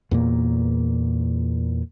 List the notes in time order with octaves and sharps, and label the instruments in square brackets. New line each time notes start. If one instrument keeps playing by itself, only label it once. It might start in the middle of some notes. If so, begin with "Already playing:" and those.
[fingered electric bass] E2 A#2 A#3